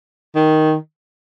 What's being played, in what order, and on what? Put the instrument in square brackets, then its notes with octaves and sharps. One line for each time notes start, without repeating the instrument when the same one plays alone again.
[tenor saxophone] D#3